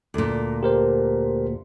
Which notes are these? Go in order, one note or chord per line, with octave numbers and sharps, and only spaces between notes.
D2 A#2
G4 A#4 C5